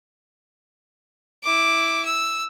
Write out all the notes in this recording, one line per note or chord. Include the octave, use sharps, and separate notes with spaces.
E4 D6
E6